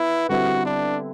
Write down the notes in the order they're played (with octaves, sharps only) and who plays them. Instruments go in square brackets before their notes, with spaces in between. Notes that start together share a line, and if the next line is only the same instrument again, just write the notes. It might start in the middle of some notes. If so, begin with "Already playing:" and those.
Already playing: [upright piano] B3 [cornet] E4
[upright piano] D3 G3 C4 E4 B4 [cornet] F#4
[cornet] D4